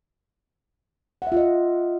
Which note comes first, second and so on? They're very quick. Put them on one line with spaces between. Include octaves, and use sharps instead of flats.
F#5 E5 F4 D#5